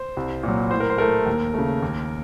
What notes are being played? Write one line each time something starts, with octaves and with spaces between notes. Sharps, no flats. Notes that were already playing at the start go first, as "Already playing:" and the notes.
Already playing: C5
C2
A#2 F#3
A2 C5
A#4
C5
A3 A#4
D#2
C#3 A3
D#2